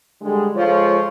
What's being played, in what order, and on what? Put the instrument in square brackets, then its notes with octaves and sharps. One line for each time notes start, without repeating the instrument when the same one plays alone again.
[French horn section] D3 G3 G#3
F3 G#3 F4 A4 C#5